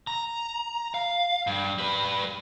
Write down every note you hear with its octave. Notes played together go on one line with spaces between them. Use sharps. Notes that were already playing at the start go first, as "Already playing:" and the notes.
A#5
F5
G2
G3 B4